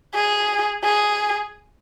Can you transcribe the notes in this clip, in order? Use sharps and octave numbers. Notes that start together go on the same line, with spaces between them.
G#4
G#4